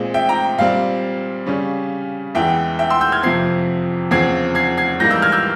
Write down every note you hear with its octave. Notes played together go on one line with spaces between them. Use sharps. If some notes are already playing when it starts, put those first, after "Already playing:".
Already playing: A#2 G#3 C4
E5 G5
G5 A#5
A#2 G3 C4 F5
C#3 G3 C#4
E2 E3 G#3 E5 G5
E5 G5
C6 E6
E6 G6
F6 G#6
F2 C3 F3 C4 G#6 C7
E2 C#3 F3 C4 G#6 C7
G#6 C7
G#6 C7
G#2 E3 G3 A#3 G6 A#6
E6 G6
F6 G#6
E6 G6